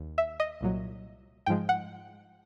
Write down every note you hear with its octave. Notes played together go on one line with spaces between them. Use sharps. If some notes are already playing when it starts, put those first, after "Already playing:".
Already playing: D#2
E5
D#5
C2 A#2 F#3
G#2 F3 G#3 G5
F#5